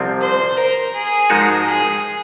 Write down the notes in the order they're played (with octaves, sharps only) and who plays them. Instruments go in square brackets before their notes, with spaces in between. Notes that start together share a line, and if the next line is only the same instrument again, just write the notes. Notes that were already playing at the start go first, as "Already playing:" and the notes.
Already playing: [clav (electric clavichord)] C2 C3 F3 C4
[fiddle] C5
A#4
G#4
[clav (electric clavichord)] G#2 F3 G#3 D#4 F#4 [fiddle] A#4
[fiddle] G#4